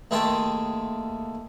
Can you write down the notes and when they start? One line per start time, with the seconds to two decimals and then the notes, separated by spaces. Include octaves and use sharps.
0.11 D#2 A3 G#4 G5 A5 C6